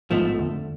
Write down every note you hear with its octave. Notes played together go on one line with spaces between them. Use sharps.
A1 G#2 F3 G#3 A3 B3
F2 D3 A3